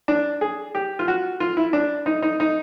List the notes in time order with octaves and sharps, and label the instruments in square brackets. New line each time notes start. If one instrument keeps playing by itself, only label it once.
[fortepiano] D4
G#4
G4
F4
F#4
F4
E4
D4
D#4
D#4
D#4